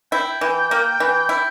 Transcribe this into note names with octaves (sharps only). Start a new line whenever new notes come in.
E4 G5
E3
A#3
E3
E4 G5